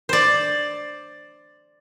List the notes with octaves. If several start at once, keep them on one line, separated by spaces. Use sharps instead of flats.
C5 D5